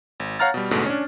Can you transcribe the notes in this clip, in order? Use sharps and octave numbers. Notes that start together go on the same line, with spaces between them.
G#1
C#5 F5 F#5 A#5 F6 A6
B2 G3
A1 E2 G#2 B2 D3 A3
C#4 D4